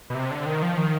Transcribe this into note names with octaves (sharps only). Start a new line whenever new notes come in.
B2
C3
D3
D#3
F3
D#3